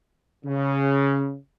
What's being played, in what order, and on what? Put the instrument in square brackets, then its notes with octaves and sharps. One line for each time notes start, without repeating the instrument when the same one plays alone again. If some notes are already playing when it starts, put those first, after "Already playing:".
[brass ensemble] C#3